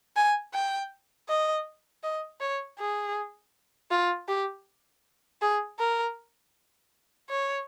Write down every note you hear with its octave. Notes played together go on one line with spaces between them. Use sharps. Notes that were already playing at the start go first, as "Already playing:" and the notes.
G#5
G5
D#5
D#5
C#5
G#4
F4
G4
G#4
A#4
C#5